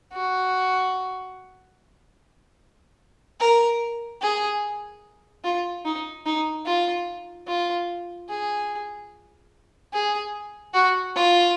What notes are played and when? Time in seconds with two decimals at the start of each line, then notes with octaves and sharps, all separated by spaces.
0.13 F#4
3.40 A#4
4.22 G#4
5.44 F4
5.85 D#4
6.26 D#4
6.66 F4
7.48 F4
8.29 G#4
9.93 G#4
10.74 F#4
11.16 F4